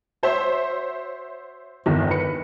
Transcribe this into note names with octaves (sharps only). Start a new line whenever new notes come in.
F#4 C5 C#5 E5
G1 E2 D#3
B4 C#7